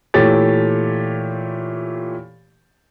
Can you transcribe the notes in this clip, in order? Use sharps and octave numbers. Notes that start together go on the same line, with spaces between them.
A#2 E3 A3 G4 C#5 A6